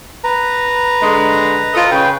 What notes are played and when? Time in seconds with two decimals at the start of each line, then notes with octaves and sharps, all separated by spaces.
0.24 B4 A#5
1.01 D3 G#3
1.73 F4 A4 D#5
1.91 C#3 B4 G5